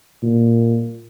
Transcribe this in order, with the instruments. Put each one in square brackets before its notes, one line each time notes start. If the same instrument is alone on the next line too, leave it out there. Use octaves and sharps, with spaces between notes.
[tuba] A#2